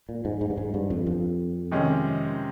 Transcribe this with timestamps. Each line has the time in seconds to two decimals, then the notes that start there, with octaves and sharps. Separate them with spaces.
0.09 A#2
0.25 G#2
0.41 G#2
0.50 G2
0.57 G#2
0.74 G2
0.90 F2
1.06 F2
1.72 C3 D#3 G#3 C#4